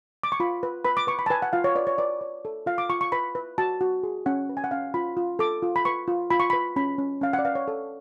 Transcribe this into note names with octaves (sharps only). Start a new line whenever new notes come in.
D6
C#6
F4 B5
B4
B4 B5
D6
B4 C#6
B5
A5
B4 G#5
F#5
F4 F5
C#5
B4 D5
C#5
B4 D5
C#5
A4
F4 F5
D6
F4 C#6
C#6
B4 B5
B4
F#4 A5
F#4
G#4
C#4 F#5
B4
G#5
F#5
C#4 F5
F4 B5
F4
A4 D6
F4
B5
B4 C#6
F4
F4 B5
C#6
B5
B4
C#4 B5
C#4
C#4 F5
F#5
D5
B4 F5
C#5
A4